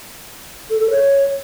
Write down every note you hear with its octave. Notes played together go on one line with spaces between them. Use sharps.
A4
A4
C#5